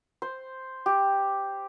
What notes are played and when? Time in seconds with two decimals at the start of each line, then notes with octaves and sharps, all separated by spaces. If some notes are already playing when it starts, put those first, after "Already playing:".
0.22 C5
0.86 G4